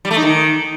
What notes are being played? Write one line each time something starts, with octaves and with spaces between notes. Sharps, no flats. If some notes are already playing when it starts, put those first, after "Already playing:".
G3
A3
D#4
D#3